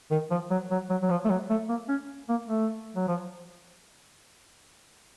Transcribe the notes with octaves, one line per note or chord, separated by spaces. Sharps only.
D#3
F3
F#3
F#3
F#3
F#3
F3
A3
F#3
A3
A#3
C#4
A#3
A3
F#3
F3